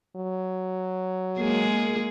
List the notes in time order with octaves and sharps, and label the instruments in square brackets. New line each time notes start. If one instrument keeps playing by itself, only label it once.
[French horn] F#3
[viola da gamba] G#3 A#3 G#4